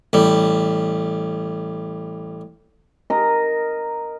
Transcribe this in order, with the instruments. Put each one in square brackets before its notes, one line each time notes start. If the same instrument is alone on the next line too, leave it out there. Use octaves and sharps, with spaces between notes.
[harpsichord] A1 G3
[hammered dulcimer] A#4 D#5